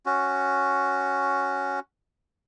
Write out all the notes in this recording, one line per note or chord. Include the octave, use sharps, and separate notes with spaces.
C#4 F#4